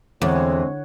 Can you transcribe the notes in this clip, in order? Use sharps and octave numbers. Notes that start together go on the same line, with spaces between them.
E2 D3 G#3 A3 C4 C#5 F#5